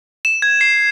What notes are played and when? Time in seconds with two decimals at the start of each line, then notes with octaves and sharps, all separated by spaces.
0.25 E7
0.42 G#6
0.61 C7